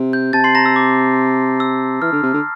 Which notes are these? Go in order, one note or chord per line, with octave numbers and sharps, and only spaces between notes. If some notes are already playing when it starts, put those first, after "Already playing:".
Already playing: C3
G6
C3 A5 A6
C6 C7
A#5 A#6
E6
D6
E6
E3 F6
D3
C3
D3